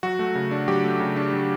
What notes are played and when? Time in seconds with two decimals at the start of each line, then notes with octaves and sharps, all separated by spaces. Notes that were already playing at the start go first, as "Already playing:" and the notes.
0.03 F#3 F#4
0.19 A3
0.35 C#3
0.51 D4
0.68 F#3 G4
0.84 A3
1.00 C#3
1.16 D4
1.33 F#3